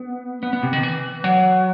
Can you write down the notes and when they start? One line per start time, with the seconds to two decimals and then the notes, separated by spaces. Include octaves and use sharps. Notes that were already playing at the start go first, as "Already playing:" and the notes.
Already playing: B3
0.43 B3
0.53 B3
0.63 C3
0.73 D#3
0.83 E3
1.24 F#3